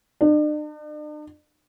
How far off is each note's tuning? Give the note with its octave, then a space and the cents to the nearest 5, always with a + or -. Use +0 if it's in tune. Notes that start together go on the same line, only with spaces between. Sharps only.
D4 +45